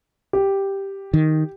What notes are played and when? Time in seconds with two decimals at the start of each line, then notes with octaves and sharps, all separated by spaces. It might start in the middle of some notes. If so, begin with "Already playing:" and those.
0.33 G4
1.14 D#3